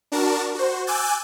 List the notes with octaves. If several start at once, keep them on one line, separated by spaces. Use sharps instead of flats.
D4 F#4 A#4 A5
F#4 C5
G#5 D6 E6 F#6 G6 A6